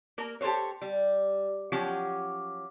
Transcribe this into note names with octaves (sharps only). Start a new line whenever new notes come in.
A#3 A#4
G4 A4 A#4 C5 C#5
G3
F3 F#3 C#4 G4